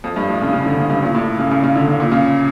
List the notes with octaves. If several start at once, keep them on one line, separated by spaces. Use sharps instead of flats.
F2
G2
A2
C#3
C#3
D3
C#3
G2
A#2
A2
C#3
C#3
C#3
D3
C#3
A#2
C#3